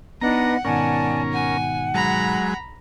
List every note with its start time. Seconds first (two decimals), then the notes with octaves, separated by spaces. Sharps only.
0.21 B3 D4 D#4 B4 D#5 F#5 A#5
0.65 G#2 B2 D#3 C#4 A#4 D5 G#5 A5
1.32 F#5 G#5
1.94 F#3 G#3 A#5 B5